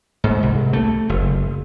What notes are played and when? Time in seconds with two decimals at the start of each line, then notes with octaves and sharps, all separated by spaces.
0.24 G#2
0.43 C2
0.73 A3
1.09 F#1